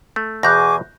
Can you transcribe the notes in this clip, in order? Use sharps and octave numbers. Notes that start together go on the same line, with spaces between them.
A3
E2 B2 G#4 C#6 D6 F#6 G6 A#6